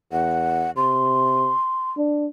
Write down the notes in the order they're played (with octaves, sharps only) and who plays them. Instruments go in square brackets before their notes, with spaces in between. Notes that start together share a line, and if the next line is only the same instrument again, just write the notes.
[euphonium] E2 [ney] F#5
[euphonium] C3 [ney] C6
[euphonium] D4